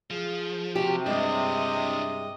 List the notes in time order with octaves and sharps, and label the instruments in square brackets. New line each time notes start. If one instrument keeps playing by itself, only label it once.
[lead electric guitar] F3 [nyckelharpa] G#4
[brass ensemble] C3 [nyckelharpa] F#4 [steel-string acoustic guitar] G4
[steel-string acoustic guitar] G2 G#3 [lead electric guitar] D4 E4 [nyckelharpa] D#5